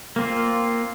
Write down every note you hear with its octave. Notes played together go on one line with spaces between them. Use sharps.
A#3 C4 F4